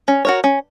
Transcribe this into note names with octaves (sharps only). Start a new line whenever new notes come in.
C#4
F#4 A#4 C#5
C#4